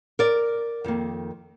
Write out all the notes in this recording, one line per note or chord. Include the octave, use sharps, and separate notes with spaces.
A#4 D5
F2 D#3 A#3